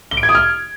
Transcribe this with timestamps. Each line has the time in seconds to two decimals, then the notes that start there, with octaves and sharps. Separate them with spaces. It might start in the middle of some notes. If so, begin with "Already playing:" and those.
0.11 G7
0.17 D7
0.23 G#6
0.29 D#6
0.35 F6